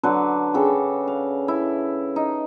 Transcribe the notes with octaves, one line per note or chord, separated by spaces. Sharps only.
D3 F#3 D4 B4
C#3 A4 G5 D6
F5
E4
D#4